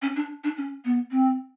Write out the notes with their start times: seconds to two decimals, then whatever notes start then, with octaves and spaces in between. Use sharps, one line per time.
0.02 C#4
0.16 D4
0.44 D4
0.57 C#4
0.85 B3
1.11 C4